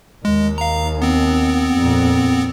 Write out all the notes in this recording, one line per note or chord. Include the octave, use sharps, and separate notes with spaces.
D#2 G#3
F5 A#5
B3 C4
F2 A#2